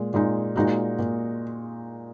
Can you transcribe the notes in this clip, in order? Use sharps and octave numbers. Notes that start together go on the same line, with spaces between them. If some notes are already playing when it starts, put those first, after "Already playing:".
Already playing: A#2 G#3
A#2 G#3 D#4
A#2 G#3 D#4 F#4
A#2